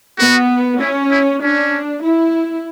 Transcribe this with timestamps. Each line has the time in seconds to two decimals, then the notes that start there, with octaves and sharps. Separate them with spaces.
0.18 B3 F#4
0.80 C#4 E4
1.11 E4
1.42 C#4 D4
2.03 E4